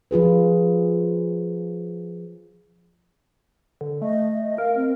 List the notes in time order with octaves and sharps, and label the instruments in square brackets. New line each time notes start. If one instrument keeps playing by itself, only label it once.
[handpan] F3 F4 G#4 B4
[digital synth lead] D3
[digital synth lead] A3 [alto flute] D#5
[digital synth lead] A#4 [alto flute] F5
[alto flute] C4